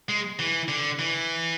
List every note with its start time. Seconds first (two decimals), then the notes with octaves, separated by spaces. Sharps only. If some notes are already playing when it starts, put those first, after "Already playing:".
0.09 G#3
0.39 E3
0.68 D3
0.99 E3